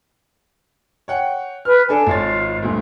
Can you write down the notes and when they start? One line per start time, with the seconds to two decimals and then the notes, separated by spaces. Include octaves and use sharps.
1.08 C#5 F#5 G5
1.65 B4 F6
1.89 D4 A4 G#5
2.07 G#1 F4 C#5 A6
2.63 D2 G2 A#2